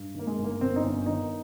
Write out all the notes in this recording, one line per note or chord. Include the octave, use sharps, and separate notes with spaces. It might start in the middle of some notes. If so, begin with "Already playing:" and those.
Already playing: G2
D#3 A#3
G#3
G1
A#3
G1 C4
D#4
G1 C#4
D#3 D#4